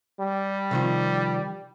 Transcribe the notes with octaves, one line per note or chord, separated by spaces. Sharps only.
G3
C3 D#3 F3